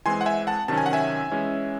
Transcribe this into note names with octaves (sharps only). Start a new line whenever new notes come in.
E3 G#3 C4 G#5 C6
F#5
E5 G#5
F#5 A5
C3 D#3 F#3 C#4 A5
G#5
F#5
E5 G#5
E3 G#3 C#4